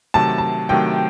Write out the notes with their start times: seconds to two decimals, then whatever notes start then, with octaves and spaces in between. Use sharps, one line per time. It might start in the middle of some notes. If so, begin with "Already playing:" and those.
0.14 C3 D#3 F#3 A3 A5
0.38 A5
0.69 C3 D#3 F#3 A3 G5